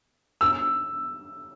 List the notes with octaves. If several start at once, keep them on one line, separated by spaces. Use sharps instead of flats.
E6